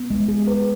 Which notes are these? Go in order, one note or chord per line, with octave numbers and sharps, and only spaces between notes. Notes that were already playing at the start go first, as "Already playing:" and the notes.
Already playing: B3
G#3
G#4
B4